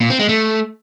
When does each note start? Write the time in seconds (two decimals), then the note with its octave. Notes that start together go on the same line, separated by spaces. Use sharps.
0.01 A#2
0.10 C4
0.19 G#3
0.29 A3